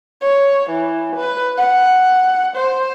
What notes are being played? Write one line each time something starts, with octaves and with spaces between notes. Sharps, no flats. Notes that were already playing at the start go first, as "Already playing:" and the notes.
C#5
E3
B4
F#5
C5